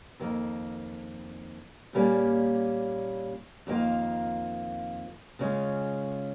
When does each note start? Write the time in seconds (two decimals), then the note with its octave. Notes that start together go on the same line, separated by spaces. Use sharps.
0.20 F2 D#3 A#3
1.93 A#2 G3 A#3 C#4
3.67 F2 D#3 A#3 F4
5.39 C#3 G#3 C#4 F4